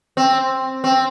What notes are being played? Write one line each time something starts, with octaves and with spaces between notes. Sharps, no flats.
C4
C4